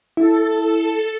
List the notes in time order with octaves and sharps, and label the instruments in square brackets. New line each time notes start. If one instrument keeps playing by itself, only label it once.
[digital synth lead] E4 [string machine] A4